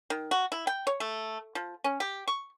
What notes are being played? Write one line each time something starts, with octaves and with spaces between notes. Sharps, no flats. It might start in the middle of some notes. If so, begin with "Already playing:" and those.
D#3
F#4
E4
G5
C#5
A3
F3
C#4
G4
C#6